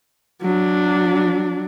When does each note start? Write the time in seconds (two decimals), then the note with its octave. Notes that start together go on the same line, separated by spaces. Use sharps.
0.43 F#3 D4